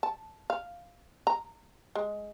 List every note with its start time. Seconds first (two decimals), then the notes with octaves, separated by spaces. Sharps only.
0.03 A5
0.50 F5
1.27 A#5
1.95 G#3